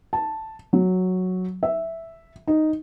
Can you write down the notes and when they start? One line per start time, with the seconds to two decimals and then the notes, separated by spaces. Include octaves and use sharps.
0.13 A5
0.73 F#3
1.63 E5
2.47 D#4